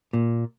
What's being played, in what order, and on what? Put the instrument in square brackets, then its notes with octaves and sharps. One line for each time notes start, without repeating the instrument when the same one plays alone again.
[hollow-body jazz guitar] A#2